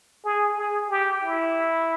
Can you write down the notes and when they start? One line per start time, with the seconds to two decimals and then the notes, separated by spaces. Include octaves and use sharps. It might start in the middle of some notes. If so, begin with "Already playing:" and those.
0.25 G#4
0.57 G#4
0.90 G4
1.23 E4